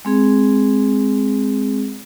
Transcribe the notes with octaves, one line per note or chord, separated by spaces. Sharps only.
G#3 C4 G#4